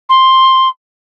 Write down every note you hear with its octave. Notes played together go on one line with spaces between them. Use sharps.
C6